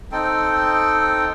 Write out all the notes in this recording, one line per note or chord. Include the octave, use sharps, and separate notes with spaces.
C4 D#4 A4 G5